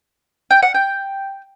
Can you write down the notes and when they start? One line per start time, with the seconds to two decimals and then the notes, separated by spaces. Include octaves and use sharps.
0.51 G5
0.62 F#5
0.75 G5